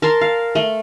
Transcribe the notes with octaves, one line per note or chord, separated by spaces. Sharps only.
A#4 A5 C6
F5
A3